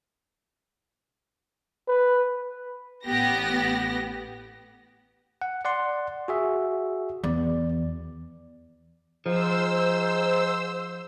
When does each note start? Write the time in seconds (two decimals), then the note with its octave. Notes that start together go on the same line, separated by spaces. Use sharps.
1.88 B4
3.06 A1 B3 G4 A#6
5.42 F#5
5.65 D5 F#5 C6
6.28 F#4 G#4 E5
7.24 E2 D5
9.26 G#2 F3 C5 E6